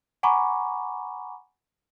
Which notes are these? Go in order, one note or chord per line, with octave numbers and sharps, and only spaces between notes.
F#5 G#5 A#5 B5 C#6 D6